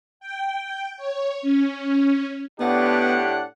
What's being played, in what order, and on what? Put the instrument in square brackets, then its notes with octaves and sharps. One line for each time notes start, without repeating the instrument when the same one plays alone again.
[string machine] G5
C#5
C#4
[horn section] A2 F#5 [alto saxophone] B3 [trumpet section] D4 G4